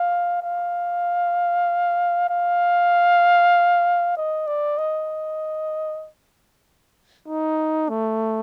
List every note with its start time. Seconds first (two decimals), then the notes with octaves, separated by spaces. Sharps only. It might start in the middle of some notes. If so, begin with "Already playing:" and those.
Already playing: F5
0.43 F5
2.30 F5
4.17 D#5
4.47 D5
4.78 D#5
7.27 D#4
7.89 A3